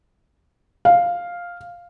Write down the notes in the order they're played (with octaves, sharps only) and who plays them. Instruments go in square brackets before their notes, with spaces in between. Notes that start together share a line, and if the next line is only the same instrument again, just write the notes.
[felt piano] F5